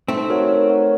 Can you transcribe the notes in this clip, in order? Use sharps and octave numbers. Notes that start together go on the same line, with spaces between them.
A3 C4 D#4
F#4 A#4 C#5 F#5
D#4
F#4 A#4 C#5 F#5